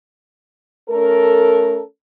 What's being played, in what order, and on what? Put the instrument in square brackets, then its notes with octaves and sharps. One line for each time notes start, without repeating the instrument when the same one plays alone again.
[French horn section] A3 C#4 A4 A#4